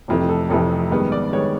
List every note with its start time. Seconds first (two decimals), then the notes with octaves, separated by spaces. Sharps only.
0.08 F1 F2 C3 E3 A3
0.29 A4
0.50 F1 F2 C3 E3 A3 A4
0.91 G2 D#3 G#3 B3
1.12 D5
1.32 G2 D#3 G#3 B3 C#5